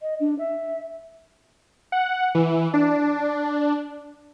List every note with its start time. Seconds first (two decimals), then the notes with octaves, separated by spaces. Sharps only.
0.02 D#5
0.20 D4
0.39 E5
1.92 F#5
2.35 E3
2.74 D4